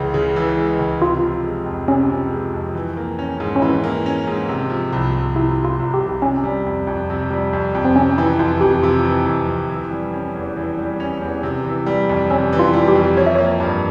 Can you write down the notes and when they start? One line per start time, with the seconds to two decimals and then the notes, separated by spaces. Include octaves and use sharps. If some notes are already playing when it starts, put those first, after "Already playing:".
Already playing: C#2 C#3 E3 G#3
0.14 C#3
0.36 E3
0.58 G#3
0.79 C#2
1.02 C3 F4
1.23 F3
1.44 G#3
1.66 F2
1.88 C3 C#4
2.09 F3
2.31 G#3
2.53 F2
2.74 E3
2.97 A#3
3.19 C#4
3.40 G#2
3.56 C#4
3.62 E3 E4
3.84 A#3
4.06 C#4
4.27 G#2
4.48 C3
4.70 F3
4.93 C2
5.14 C2
5.36 C3 E4
5.57 F3
5.65 F4
5.79 C2
5.94 G4
6.00 C2
6.22 C3 C#4
6.44 G3
6.66 F2
6.87 F2
7.10 C3
7.30 G3
7.53 F2
7.75 F2
7.85 C4
7.96 C3 C#4
8.18 E3 E4
8.39 F2 F4
8.61 F2 G4
8.83 C3 F4
9.05 E3
9.26 F2
9.48 F2
9.70 E3
9.91 G3
10.14 C#4
10.36 E2
10.57 E3
10.78 G3
11.00 C#4
11.22 E2
11.43 C3
11.65 E3
11.86 G3
12.09 F2
12.30 C3 C#4
12.53 E3
12.59 F4
12.73 G3
12.88 G4
12.95 F2
13.17 F3 C#5
13.26 E5
13.35 A#3 C#5
13.60 G2